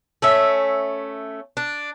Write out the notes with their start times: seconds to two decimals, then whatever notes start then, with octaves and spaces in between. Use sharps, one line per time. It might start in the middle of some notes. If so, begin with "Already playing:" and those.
0.22 A3 C#4 E5
1.57 D4